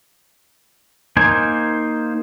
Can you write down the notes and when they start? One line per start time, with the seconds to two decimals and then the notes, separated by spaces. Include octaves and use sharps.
1.17 A#3 D#4 C5 G#5